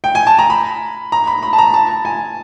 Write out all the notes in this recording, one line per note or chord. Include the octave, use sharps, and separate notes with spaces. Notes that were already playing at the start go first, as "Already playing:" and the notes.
G5
G#5
A5
A#5
B5
A#5
B5
B5
A5
A#5
A5
G#5